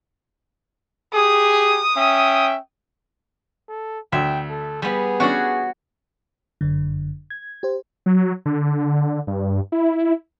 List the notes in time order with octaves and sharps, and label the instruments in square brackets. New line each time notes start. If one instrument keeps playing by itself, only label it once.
[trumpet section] G4 G#4 [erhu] D#6
[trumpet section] C#4 E5 G5
[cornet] A4
[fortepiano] D2 [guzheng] E5 [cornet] G5
[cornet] A4
[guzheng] G3 B3 [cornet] G#4
[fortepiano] B3 C#4 D4 [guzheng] F#4 C#5 F#5
[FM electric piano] G1 F#2 D3
G#6
G4 C5
[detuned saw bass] F#3
D3
G2
E4